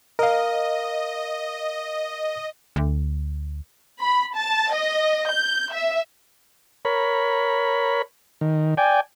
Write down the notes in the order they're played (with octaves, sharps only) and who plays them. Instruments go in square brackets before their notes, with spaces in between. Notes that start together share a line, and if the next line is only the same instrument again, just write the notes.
[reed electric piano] A#4 F5 [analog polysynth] D#5
[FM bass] D2
[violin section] B5
A5
D#5
G6
E5
[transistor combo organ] A#4 C#5 B5
D#3
D5 G5 G#5